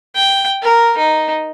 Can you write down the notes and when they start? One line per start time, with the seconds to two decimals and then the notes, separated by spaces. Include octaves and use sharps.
0.15 G5
0.62 A#4
0.97 D#4